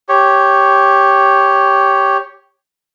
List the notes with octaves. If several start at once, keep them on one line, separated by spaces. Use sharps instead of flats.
G4 C#5